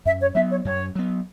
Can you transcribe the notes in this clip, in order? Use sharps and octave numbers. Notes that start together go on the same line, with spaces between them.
F#2 E5
C#5
F#3 B3 E5
C#5
F#2 C#5
F#3 B3